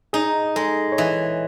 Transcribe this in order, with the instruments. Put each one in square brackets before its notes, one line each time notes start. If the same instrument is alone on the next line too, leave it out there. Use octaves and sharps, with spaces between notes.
[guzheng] D#4 [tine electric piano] G#4
[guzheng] G#3 [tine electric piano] A4
[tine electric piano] C#5
[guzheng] E3 [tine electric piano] D#5